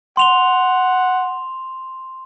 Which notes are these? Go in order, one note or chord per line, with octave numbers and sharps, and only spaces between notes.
F#5 C6 F7 G7